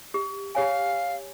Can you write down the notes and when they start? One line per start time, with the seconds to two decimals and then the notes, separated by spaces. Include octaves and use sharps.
0.14 G4
0.55 G4 C#5 F5 G#5